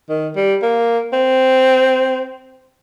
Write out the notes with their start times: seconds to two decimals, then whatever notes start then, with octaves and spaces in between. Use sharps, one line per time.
0.09 D#3
0.36 G3
0.62 A#3
1.13 C4